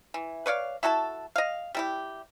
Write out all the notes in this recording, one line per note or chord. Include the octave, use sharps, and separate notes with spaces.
E3
B4 C#5 D5 F5
E4 F#4 A4 A5
D#5 F5
G3 E4 G4